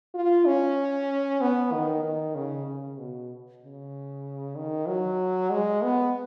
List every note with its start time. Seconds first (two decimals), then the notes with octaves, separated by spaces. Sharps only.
0.15 F4
0.46 C#4
1.41 B3
1.73 D#3
2.04 D#3
2.35 C#3
2.67 C#3
2.98 B2
3.62 C#3
4.56 D#3
4.88 F#3
5.50 G#3
5.82 B3